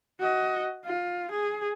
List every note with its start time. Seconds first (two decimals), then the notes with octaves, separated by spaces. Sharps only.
0.20 F#4 D#5
0.85 F4
1.31 G#4